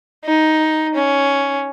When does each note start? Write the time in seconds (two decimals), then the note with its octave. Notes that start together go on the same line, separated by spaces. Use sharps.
0.25 D#4
0.95 C#4